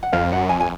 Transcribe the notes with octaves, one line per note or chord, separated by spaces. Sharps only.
F#5
F2 F5
F#2 F#5
F2 G#5
G#5